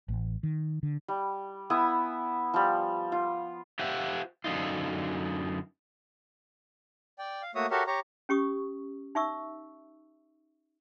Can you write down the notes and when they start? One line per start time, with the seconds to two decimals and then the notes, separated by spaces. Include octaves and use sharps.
0.08 A1
0.43 D#3
0.83 D3
1.08 G3
1.70 B3 E4 G#5 D#6
2.54 F3 G3
3.12 F4
3.79 F4 G4 C5 E5 F#5
4.44 F#2 D3 D#4 F4
7.19 D5 G5
7.42 F5
7.55 A3 A#3 F#4 C#5 E5 D#6
7.71 F#4 G4 A4 A#4 C#5 E5
7.87 G4 C#5 A#5
8.29 C#4 G4 C#6 D#6
9.15 D#4 E5 C#6 E6